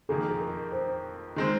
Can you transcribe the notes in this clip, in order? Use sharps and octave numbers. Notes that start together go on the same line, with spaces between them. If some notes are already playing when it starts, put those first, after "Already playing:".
F2 D#3 A#3 G#4
G#4
A#4
C5
D#3 G#3 C4